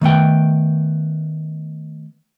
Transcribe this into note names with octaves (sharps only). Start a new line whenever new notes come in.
D#3 A3 B3 G5